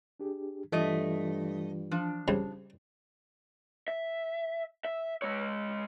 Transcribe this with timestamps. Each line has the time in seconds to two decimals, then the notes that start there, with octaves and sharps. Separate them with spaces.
0.20 D4 G4 G#4
0.72 G2 E3 A3 F4 D#5
1.91 F3 D4
2.28 C#3 G3 C4
3.88 E5
4.85 E5
5.22 G#3 C#5